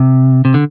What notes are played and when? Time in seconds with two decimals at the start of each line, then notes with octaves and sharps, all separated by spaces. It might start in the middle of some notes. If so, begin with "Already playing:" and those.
Already playing: C3
0.45 C3
0.54 D3